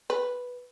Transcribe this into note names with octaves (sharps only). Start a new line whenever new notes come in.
B4